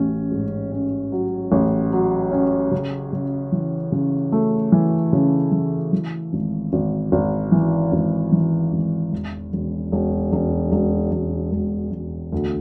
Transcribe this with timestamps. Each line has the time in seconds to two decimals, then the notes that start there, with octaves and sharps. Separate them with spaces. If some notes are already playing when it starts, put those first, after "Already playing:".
Already playing: A1 C#4
0.31 G#2
0.72 C#4
1.12 F#3
1.52 A1
1.93 F#3
2.32 C#4
2.72 C#3
3.13 C#3
3.52 E3
3.92 C#3
4.32 A3
4.72 E3
5.13 C#3
5.52 E3
5.93 E3
6.33 G#1
6.73 G#1
7.12 G#1
7.52 E3
7.92 G#1
8.32 E3
8.72 G#1
9.12 E1
9.53 E1
9.92 E1
10.32 E1
10.72 E1
11.12 E1
11.52 E1
11.92 E1
12.32 D2